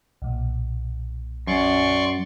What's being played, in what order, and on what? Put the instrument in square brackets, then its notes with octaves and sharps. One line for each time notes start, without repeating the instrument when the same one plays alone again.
[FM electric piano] B1 A#2
[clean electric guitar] F#2 [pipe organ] D5 C6 C#6